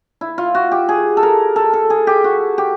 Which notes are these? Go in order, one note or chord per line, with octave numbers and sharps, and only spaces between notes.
E4
F4
F#4
G4
G#4
A4
A#4
A4
A4
G#4
G4
F#4
G4